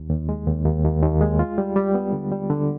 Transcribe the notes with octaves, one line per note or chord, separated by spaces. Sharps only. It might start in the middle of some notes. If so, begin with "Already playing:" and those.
Already playing: D#2
D#2
G#3
D#2
D#2
D#2
D#2
G#3
F4
G3
G3
B3
D3
G3
D3